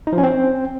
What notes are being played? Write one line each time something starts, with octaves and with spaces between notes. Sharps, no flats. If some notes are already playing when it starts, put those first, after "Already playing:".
D#4
F3
C#4
C4